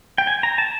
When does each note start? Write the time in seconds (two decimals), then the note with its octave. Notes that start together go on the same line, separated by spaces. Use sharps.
0.18 G5
0.27 G#5
0.43 A#5
0.58 A5